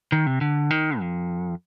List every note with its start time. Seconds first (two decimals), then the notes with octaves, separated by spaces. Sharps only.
0.12 D#3
0.27 C3
0.41 D3
0.71 D#3
1.00 F2